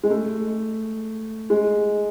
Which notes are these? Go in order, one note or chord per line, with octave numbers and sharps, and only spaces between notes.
G#3
A3
G#3